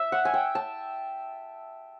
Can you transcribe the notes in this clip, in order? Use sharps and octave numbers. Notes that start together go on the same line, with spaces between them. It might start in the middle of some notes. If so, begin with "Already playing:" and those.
Already playing: E5
F#5
G#5
G5
A5